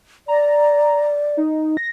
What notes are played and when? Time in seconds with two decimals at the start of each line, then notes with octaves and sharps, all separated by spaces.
0.28 D5 A#5
1.37 D#4
1.77 A#6